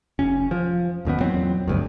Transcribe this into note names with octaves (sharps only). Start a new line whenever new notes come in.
F1 C#4
F3
D#1 F#2 D#3 B3
E2 A#2 F#3 C4
G#1 D2 G2